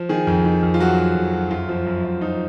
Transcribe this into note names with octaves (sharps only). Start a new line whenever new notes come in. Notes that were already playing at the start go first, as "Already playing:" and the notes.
Already playing: F3
D#3 G#4
F2
D#3
F2
F4
F#3 F#4
F#3
F2
F#3
F#2 F4
F3
F#2
F#2
F3 D#4